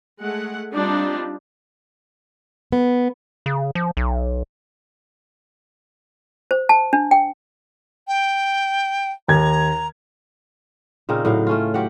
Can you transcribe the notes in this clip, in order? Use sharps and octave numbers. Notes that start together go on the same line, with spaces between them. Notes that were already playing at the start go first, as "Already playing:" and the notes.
G#3 A3 F#5
G3 C4 D4 D#4 F4
B3
C#3
F3
B1
C5
A5
D4
G5
G5
D#2 A#5 G#6
A#2 C#3 C4 D#4
A2 F#3 F5
A3 C#4 F4
F#3 G4 F#5